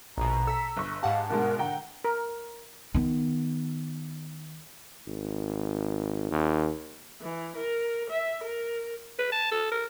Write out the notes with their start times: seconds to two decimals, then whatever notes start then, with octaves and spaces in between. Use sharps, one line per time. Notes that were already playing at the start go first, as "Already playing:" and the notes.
0.18 A#1 B2 A#5
0.47 A4 E6 B6
0.77 G1 C#6
1.03 G#2 G4 F5 F#5 A5
1.30 G2 B2 G#3 A#4
1.59 D3 F#5 G5 A#5
2.04 A#4
2.94 D#3 B3
5.07 G#1
6.31 D#2
7.21 E3
7.56 A#4
8.10 E5
8.43 A#4
9.19 B4
9.32 A5
9.52 A4
9.72 A#4